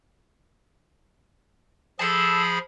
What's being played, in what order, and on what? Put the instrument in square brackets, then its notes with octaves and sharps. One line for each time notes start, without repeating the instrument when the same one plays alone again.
[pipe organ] F3 G#4 B5 [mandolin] A4 A5